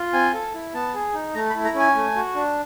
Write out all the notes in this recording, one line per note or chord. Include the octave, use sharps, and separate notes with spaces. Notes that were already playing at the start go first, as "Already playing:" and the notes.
Already playing: F4
C4 G#5
A4
E4
B3 A5
G#4
D#4
A3 A#5
B5
E4
A#5
C#4 G#5
A3
F#4
D4